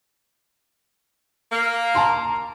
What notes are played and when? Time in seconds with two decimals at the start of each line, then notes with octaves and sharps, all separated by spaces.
1.51 A#3
1.95 A5 A#5 C6